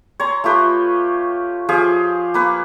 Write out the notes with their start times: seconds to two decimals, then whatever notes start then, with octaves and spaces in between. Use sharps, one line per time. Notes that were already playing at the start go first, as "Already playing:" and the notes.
0.20 C#5 A#5 C6
0.44 A3 F4 G4 B4
1.69 F3 G4 G#4 F5
2.34 A#3 B4 C#6